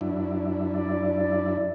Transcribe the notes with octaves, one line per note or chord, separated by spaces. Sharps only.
F#2 D4 E4
D5